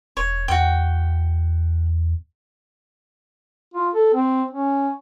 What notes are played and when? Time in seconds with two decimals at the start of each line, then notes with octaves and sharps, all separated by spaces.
0.17 E1 C#5
0.48 E2 F#4 G5
3.74 F4
3.94 A4
4.13 C4
4.51 C#4